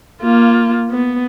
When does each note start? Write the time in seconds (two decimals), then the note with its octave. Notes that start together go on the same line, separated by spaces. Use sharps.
0.21 A#3 F4
0.91 B3